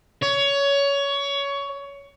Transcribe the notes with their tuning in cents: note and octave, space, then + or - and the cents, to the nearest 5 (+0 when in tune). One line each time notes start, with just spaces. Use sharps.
C#5 +20